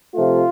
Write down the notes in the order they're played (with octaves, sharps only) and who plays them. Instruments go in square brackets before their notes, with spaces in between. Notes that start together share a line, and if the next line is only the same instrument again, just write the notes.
[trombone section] C3 F3 A3 F4